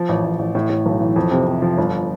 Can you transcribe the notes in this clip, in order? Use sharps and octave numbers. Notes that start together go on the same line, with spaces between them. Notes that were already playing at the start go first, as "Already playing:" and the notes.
Already playing: F3
A1
A1
A1
A2
A2
B1
E3
F2
C3
C3
F3
G1